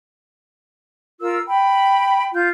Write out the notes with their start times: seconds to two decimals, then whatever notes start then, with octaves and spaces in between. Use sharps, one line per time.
1.21 F4 A#4 E6
1.47 G5 B5
2.33 F4 G6